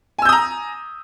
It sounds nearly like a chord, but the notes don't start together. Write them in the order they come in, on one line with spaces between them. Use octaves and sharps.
G#5 E6 G6 D#6 A#5